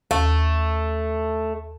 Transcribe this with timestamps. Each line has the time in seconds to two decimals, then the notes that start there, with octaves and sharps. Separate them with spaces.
0.11 D#2 A3